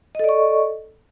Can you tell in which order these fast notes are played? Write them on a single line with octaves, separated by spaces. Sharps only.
D#5 A4 D5 C#6